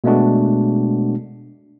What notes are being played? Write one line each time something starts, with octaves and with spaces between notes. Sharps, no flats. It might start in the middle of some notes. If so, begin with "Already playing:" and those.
B2 G#3 A3 B3 D4 F#4